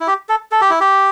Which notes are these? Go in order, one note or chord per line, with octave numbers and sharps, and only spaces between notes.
E4
G4
A4
A4
G4
E4
G4